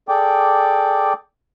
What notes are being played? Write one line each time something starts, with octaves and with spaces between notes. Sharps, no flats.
G#4 A4 D5 G5 D6